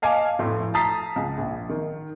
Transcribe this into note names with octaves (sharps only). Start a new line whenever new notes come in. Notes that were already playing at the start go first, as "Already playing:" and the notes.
D#5 F5 G#5 A5 D6
F1 A2 A3 C6
A5 A#5 D#6 A6 B6 C7
C#2
A#1
D#3